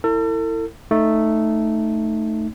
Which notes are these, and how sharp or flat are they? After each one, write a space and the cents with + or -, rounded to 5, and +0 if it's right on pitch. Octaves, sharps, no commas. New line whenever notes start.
E4 +0 A4 +40
A3 +0 D#4 -5